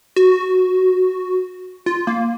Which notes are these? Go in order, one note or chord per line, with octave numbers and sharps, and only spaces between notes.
F#4
F4
A#3